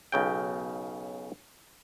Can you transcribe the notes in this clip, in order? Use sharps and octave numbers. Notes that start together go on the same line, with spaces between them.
B1 C#3 G5